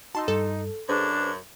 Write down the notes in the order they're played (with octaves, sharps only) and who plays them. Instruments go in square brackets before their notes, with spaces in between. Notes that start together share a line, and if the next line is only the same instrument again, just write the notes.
[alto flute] D#4 [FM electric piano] F#4 E6 [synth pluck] A5 C6
[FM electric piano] G2 G3 [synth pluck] A4
[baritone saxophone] F#2 [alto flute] D4 [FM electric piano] G#4 B4 C5